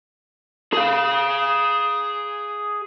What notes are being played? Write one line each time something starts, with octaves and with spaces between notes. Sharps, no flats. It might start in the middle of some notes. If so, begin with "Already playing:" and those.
G#4 F5